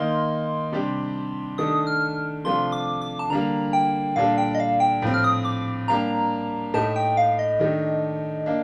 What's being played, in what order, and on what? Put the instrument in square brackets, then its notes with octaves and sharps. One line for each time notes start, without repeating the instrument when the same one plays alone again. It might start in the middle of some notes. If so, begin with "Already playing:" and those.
Already playing: [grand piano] D#3 A#3 D#4 [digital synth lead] C6
[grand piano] C3 G3 D4 G4
[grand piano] D#3 A3 D4 A4 [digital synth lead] D#6
[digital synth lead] F6
[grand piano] C3 F3 A3 D4 F4 [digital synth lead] C6
[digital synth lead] D6
D6
A5
[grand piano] D3 G3 A#3 [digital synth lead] A#5
[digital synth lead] G5
[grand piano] A#2 G3 D4 A4 [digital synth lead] F5
[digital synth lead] G5
D#5
F5
G5
[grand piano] A2 F3 C4
[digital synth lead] F6
D#6
D6
[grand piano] G3 A#3 D4 G4 [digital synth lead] A#5
[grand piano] A2 A3 D#4 G4 [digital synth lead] A5
[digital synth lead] G5
F5
D#5
[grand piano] D#3 A3 D4 G4
A#3 D4